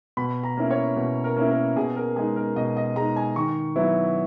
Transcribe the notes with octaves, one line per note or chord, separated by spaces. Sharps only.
B2 B5
A#5
A#3 C#4 E4
C#5
B2
A#4
A#3 C#4 E4
A#4
B2 G#4
A#4
G#3 D#4 G#4
A#4
B2 D#5
D#5
G#3 D#4 A#5
G#5
D#3 C#6
F#3 B3 E4